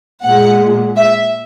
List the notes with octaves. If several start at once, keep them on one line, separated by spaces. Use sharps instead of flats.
A#2 G#3 F#5
E5